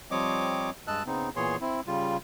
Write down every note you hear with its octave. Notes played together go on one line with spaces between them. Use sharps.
F3 G3 C4 C#5 D#5 D6
G2 G#3 D#5 A5 E6 F#6
C#3 B3 C4 D#4
A#2 E3 B3 G#4 C#5 C6
C4 E4
C#3 G3 F4